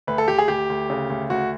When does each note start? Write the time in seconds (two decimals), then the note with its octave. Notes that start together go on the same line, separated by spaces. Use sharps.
0.07 D2 B4
0.18 A4
0.28 D2 G4
0.38 G#4
0.48 D2 G4
0.69 D2
0.90 C#3
1.10 D2
1.30 D2 F#4